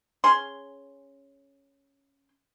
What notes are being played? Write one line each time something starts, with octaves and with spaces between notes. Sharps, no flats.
C#4 G#4 C6